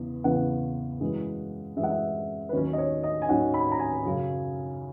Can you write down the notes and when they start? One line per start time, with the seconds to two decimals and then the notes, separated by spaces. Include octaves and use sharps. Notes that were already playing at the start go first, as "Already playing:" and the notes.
Already playing: E2 C#3 B3
0.24 E2 C#3 E3 B3 F#5
1.00 F#2 E3 G#3
1.77 F#2 E3 G#3 E5
1.84 F#5
1.91 E5
2.49 B4
2.53 D#2 D#3 F#3 C#4 C#5
2.73 D#5
2.78 C#5
3.03 D#5
3.22 G#5
3.29 D#2 D#3 F#3 C#4 F#5
3.54 B5
3.72 A#5
3.79 G#5
4.05 F#2 C#3 F#3